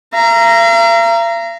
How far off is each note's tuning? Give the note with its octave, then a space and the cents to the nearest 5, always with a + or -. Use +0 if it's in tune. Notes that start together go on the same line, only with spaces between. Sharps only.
F5 -45 A#5 +0